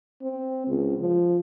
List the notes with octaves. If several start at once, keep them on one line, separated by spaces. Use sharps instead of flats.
C4
C#2
F3